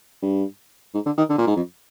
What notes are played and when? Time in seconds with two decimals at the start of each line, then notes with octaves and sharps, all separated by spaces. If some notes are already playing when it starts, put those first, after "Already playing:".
0.22 G2
0.94 G#2
1.06 D3
1.18 D#3
1.29 D3
1.38 A#2
1.47 G#2
1.56 F2